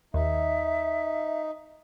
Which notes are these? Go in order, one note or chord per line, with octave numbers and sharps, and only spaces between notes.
D#2 D#4 E5